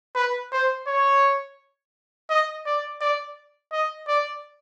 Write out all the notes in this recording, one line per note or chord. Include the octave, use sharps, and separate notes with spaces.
B4
C5
C#5
D#5
D5
D5
D#5
D5